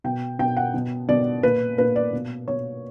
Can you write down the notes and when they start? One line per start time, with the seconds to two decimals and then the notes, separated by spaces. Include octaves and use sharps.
0.04 B2 G5
0.39 B2 G5
0.57 F#5
0.74 B2
1.09 B2 D5
1.43 A#2 B4
1.78 A#2 B4
1.96 D5
2.13 B2
2.48 B2 C#5